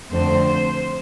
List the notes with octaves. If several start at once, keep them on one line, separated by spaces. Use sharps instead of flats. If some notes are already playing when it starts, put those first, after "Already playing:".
F2 D3 A3 C4 C5